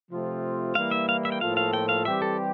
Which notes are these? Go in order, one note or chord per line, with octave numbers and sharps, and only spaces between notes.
C3 F3 A3 C4 F4
E3 G3 A#3 E4 F5
E5
F5
E5
G5
A2 F3 A#3 F4 A4 F5
F5
G5
F5
E3 G3 C4 G4 E5
A4